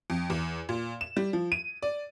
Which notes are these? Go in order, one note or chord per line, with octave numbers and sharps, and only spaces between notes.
F2
E2
A#2
E7
G3
F3
D#7
D5